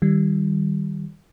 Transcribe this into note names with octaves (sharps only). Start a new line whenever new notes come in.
D#3 G3